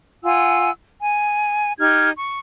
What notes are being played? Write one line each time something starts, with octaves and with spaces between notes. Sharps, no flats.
F4 F#5 G#5 E6
G#5
D#4 G4 F6 G#6
C#6